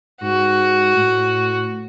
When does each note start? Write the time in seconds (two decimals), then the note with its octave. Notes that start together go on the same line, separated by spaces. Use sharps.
0.21 G#2 F#4
0.95 A2